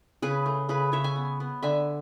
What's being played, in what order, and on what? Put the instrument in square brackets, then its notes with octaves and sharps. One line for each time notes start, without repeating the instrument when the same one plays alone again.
[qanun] C#3 G#4 B4
A3
C#3 G#4 B4
C#3 C#5 E5
E5 G#5
B3
B3
D3 E5 G#5